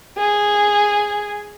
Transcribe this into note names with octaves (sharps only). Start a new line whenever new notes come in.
G#4